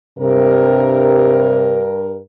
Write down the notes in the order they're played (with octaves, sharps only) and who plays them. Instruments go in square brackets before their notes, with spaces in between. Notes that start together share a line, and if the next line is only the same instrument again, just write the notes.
[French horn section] G2 A#4 [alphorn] C3